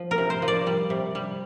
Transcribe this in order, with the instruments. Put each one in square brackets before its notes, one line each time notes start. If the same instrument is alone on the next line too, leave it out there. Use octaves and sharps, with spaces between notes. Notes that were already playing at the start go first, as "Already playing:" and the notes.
Already playing: [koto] F3
A#4
C3
C5
F3
D5
G3
C3
G3